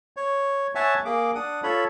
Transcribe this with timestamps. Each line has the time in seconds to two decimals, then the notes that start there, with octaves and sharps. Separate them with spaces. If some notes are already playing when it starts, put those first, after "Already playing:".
0.17 C#5
0.75 C#5 E5 F#5 G#5 A5
1.05 A#3 G#4 D6
1.35 D4 F#5 D#6
1.63 F4 A4 C#5 B5